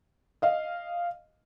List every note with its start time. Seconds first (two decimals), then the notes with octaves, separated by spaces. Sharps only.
0.42 D#5 F5